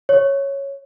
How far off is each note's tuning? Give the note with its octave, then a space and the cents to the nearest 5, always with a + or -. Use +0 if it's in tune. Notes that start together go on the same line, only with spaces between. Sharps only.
C#5 -5